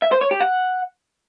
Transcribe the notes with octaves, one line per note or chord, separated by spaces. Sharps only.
E5
C5
C#5
G4
F#5